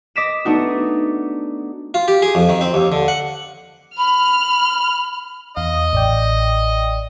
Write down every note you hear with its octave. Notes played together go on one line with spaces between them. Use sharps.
D#5 D6 A#6 B6 D7 E7
A3 B3 D4 D#4 F#4
F4
G4
G#4
F2
D#3
C4
D#2
D3
F#5
B5 F6
E2 D#5 F5
A1 D5 G5